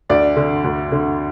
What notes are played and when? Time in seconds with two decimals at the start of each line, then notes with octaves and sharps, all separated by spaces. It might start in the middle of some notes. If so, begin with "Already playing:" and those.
0.09 D2 D5
0.37 D3
0.64 D2
0.92 D3